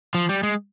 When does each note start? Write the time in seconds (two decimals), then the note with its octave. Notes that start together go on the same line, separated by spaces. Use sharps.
0.15 F3
0.29 G3
0.43 G#3